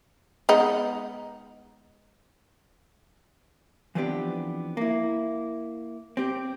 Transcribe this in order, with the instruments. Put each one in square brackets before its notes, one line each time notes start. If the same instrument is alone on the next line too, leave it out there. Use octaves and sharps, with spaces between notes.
[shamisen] G#3 B3 D#4
[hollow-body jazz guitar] E3 F3 B3 C4 D4 G4
A#3 E4
C4 G4